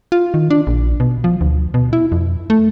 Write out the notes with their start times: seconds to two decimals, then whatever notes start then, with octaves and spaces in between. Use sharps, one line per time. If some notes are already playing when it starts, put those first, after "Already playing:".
0.12 F4
0.34 D#3
0.50 D4
0.67 A#1
1.00 B2
1.24 F3
1.41 D2
1.74 B2
1.93 E4
2.12 F2
2.50 A3